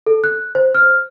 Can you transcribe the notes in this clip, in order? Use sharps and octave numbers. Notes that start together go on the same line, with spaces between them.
A4
F#6
C5
F6